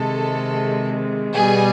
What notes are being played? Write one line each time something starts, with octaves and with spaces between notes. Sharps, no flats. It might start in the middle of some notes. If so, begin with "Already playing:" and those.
Already playing: C3 D#3 G#3 A4
B2 G3 G#4